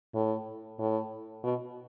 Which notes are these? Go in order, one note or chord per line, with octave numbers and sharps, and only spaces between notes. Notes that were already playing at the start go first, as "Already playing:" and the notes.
A2
A2
B2